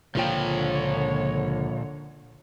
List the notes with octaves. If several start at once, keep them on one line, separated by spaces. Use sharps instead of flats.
C#2 A#2 D3 F3 F4 C#5 G5